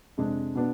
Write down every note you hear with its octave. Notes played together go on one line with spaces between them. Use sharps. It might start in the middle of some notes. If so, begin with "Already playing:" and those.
F2 C3 G#3 D4
B2 B3 D4